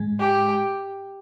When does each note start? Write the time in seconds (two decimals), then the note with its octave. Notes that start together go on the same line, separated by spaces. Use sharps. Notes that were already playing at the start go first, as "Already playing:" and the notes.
Already playing: G#2 G#3
0.19 G4